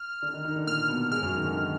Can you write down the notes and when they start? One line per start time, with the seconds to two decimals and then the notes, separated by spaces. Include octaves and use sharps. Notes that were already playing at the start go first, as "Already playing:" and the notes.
Already playing: F6
0.22 D3 D4
0.33 D#3 D#4
0.44 D#3 D#4
0.56 D3 D4
0.66 A#2 A#3 F6
0.89 B2 B3
1.11 G#2 G#3 F6
1.23 F#2 F#3
1.34 D#3
1.45 D3
1.57 D#3